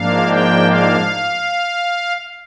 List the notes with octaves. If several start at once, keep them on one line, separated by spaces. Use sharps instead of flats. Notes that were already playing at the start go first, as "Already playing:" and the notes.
Already playing: G#2 F3 A#3 D4 F5
G5
F5